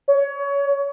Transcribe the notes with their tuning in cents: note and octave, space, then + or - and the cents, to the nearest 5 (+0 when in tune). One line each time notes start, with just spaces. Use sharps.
C#5 +20